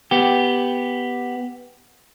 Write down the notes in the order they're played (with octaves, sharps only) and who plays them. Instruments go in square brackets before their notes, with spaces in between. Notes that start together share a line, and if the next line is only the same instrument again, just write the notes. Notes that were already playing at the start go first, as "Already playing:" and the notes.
[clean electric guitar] B3 G4